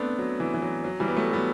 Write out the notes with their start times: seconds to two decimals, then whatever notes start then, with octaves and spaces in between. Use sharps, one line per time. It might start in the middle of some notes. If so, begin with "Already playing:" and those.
Already playing: A3 B3 C4 D4
0.19 F#3
0.40 E3
0.54 E3
0.62 F#3
0.84 F#3
1.00 E3 G3
1.08 B3
1.16 F#3 A3
1.33 G3 B3